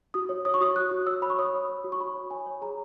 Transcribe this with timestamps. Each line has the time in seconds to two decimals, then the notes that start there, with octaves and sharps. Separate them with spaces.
0.14 F#4 D#6
0.29 C#5
0.45 C#5 D#6
0.54 C#6
0.61 F#4 D#6
0.76 F#4 F#6
0.91 F#4
1.07 C#5 E6
1.22 C#5 B5
1.30 C#6
1.39 C#5 D#6
1.54 C#5
1.69 C#5
1.84 F#4
1.92 C#6
2.00 C#5 B5
2.15 C#5
2.30 C#5 G#5
2.46 C#5
2.62 G#4 A#5